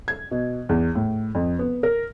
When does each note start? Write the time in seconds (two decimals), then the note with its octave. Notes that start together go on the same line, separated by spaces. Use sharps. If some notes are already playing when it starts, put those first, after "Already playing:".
0.08 G#6
0.31 B2
0.69 E2
0.95 A2
1.35 F2
1.59 B3
1.83 A#4